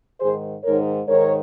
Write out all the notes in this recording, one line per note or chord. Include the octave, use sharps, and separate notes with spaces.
G#2 D#3 G#4 C5
G#2 D#3 A#4 C#5
G#2 D#3 A#4 C#5